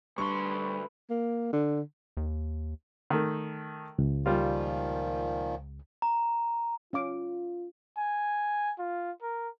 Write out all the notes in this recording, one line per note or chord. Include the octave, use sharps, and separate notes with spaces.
D2 G3 D4 B4 C6 C#6
A#3
D3
D#2
D#3 A3
C#2
A#2 D#3 F3 G3 F4
A#5
C#4 F4 F5 D6
G#5
F4
A#4